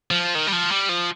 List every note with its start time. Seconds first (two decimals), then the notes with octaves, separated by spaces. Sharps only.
0.11 F3
0.35 D#3
0.47 G3
0.53 F3
0.71 G3
0.89 F3